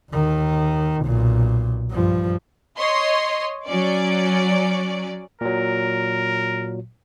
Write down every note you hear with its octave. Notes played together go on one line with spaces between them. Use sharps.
D#2 D#3
B1 A#2
G2 F3
C#5 D#5 C6
F#3 C#4 D5
A#2 F#3 A#4